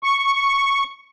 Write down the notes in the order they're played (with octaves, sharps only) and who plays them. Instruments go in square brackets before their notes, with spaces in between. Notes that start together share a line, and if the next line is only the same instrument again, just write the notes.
[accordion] C#6